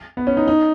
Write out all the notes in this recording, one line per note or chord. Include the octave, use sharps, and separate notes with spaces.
B3
C#4
D#4
D#4